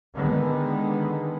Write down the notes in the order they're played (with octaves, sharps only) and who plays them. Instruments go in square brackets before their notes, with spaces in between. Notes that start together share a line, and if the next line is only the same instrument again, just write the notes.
[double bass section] D3 D#3 G#3 B3